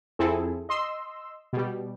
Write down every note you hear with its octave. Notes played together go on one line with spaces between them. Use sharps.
F2 C4 E4 G#4 A4
D#5 C6 E6
B2 G3